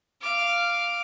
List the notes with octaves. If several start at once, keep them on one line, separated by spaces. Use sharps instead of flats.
F5 D6